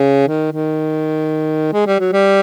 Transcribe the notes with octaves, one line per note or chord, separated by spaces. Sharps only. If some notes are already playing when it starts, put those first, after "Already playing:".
Already playing: C#3
D#3
D#3
G#3
G3
F#3
G3